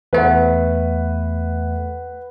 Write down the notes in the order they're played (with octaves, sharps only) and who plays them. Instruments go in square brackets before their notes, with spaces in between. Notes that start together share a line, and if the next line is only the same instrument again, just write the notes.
[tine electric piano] E2 A3 [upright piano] B4 F#5